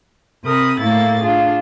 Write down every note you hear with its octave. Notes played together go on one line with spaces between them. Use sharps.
C3 A#4 B5 D#6
A2 A3 A#3 E4 A6
D4 F4 G#4